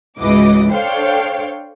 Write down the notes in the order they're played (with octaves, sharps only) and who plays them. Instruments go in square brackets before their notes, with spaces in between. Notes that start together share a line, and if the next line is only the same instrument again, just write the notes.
[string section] C#2 G#2 E3 F#4 D#5 D6
D4 A4 C5 C#5 F5 G5